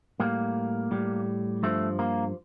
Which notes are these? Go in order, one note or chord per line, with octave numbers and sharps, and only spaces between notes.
A2 G3 A#3
A2 G3
G2 F3 A3
A#3